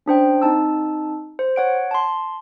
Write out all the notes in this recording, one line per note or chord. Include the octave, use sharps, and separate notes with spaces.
C#4 D4 C5 G5
C4 D#4 A5 E6
C5
C#5 F#5 D7
A5 C6